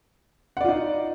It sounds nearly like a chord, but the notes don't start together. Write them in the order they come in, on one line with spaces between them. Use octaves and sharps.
F#5 D5 F4 D#4